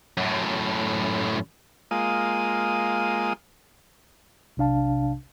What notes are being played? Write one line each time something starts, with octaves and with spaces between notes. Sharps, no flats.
F#2 A2
G#3 A#3 F4 D#6
B1 C3 D4 F5 A5